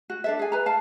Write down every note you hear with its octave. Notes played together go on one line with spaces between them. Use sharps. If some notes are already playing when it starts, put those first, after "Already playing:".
F#4
D4 A4 E5
G#4 G#5
B4 A#5
F5 A5